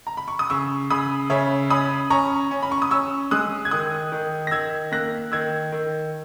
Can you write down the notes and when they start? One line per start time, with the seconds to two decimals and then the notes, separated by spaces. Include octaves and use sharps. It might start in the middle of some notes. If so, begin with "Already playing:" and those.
0.07 A#5
0.17 B5
0.28 C#6
0.39 D#6
0.50 C#3 C#6 E6
0.90 C#3 B5 D#6
1.30 C#3 C#5 E5
1.70 C#4 B5 D#6
2.10 C#4 A#5 C#6
2.51 C#4
2.63 B5
2.72 C#6
2.82 D#6
2.91 C#4 C#6 E6
3.31 G#3 D#6 F#6
3.65 G#6
3.71 D#3 D#6 F#6
4.12 D#3
4.47 A#6
4.51 D#3 E6 G#6
4.92 A#3 F#6 A#6
5.32 D#3 E6 G#6
5.72 D#3